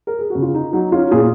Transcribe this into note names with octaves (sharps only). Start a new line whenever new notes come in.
A#4
G#4
C#3 F#4
F4
D#4
F#3 D#4
C#4 F4
A#2 F4 G#4